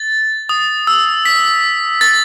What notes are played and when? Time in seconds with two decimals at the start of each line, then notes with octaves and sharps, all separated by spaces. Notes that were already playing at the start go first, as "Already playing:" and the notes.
Already playing: A6
0.49 D#6
0.87 E6
1.25 B6
2.01 A6